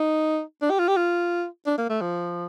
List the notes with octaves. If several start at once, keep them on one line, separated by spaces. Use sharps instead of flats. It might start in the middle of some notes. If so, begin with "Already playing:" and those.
Already playing: D#4
D4
G4
F4
G4
F4
D4
A#3
A3
F3